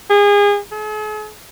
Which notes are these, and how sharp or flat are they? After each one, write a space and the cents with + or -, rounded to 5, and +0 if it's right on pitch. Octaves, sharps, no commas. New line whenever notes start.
G#4 -30
G#4 +45